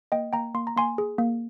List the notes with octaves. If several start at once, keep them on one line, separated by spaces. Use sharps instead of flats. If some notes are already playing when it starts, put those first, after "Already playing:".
A#3 D#5 G5
A#3 G5 A#5
A#3 C6
A#5
A#3 G#5 C6
G#4
A#3